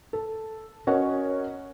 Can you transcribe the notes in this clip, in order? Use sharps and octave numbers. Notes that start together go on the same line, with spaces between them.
A4
C#4 F#4 A#4 C#5 D#5 F#5